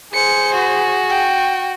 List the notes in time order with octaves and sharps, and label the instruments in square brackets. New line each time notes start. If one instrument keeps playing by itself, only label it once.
[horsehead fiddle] G#4 [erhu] C5 [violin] C#7
[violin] F#4
[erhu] G5